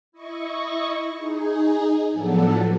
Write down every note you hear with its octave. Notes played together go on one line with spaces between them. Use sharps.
E4 D#5 C#6
D#4 G#4
A2 F3 F#3 B3 D4 A4